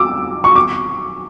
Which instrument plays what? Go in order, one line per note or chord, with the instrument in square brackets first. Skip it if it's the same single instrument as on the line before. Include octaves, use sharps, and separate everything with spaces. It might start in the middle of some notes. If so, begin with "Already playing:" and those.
Already playing: [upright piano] D6 E6
C#6
D6